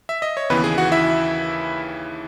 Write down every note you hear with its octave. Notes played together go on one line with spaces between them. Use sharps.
E5
D#5
C#5
D#2 C#3 E3 B3 B4
G#4
F#4 F#5
E4 E5